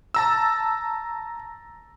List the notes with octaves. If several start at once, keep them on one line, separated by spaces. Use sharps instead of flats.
A5 A#5 E6